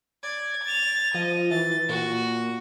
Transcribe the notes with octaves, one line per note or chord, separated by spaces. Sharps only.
D5 G#6
A6 F7
F3 D#5
E3 A6
A#2 F#4